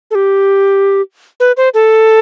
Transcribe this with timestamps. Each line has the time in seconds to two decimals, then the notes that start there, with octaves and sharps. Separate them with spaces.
0.11 A4
0.15 G4
1.40 B4
1.57 C5
1.74 A4